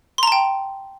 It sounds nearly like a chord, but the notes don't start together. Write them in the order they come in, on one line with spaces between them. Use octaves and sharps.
C6 A#5 A5 G5